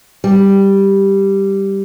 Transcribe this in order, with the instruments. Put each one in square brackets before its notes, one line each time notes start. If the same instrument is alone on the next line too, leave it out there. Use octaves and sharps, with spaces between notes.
[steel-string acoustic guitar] G3